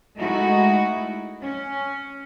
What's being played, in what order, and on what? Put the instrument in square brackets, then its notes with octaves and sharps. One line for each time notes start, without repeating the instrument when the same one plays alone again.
[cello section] G#3 A3 D#4 E4 F#4
C#4